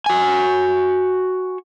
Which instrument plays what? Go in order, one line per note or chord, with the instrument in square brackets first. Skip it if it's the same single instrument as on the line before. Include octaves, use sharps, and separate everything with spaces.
[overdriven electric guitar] F#4 G#5